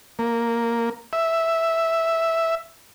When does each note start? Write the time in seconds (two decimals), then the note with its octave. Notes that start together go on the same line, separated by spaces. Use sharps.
0.19 A#3
1.13 E5